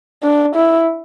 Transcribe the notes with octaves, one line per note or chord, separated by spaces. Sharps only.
D4
E4